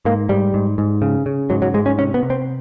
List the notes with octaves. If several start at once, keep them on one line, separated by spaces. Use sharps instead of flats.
G#2 A#3
G#2 G3
G#2
G#2
C#3
C#3
G#2 F#3
F#3
G#2 G#3
C#4
C3 C#4
B3
C3
C4